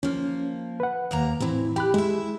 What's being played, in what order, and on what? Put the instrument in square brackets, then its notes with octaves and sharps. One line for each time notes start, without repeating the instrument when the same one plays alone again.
[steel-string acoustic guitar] F3 A#3 [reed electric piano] C#4
[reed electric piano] B4 F#5
[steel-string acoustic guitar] D#2 A#3 A#5
[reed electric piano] A2 C4 [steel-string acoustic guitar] E3 E4
[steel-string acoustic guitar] G4 [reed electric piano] G5 B5 F#6
[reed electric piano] G#3 [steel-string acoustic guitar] E4 E5